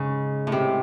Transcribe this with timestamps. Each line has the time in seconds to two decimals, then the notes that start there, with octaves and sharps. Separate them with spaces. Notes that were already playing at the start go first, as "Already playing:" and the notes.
Already playing: G#2 C#3
0.47 A2
0.52 C3